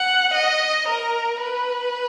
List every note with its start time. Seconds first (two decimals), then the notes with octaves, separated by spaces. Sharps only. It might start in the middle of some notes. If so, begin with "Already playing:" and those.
Already playing: F#5
0.34 D#5
0.88 A#4
1.44 B4